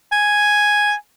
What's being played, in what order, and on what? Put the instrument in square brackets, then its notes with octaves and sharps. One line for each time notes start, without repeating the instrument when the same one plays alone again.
[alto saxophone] G#5